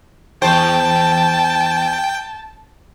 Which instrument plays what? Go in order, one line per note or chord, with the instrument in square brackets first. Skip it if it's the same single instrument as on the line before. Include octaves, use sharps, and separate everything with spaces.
[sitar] E2 C5 [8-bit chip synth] G5 [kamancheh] A5